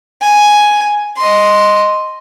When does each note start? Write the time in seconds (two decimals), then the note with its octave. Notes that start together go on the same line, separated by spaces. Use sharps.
0.22 G#5
1.17 D#5 C6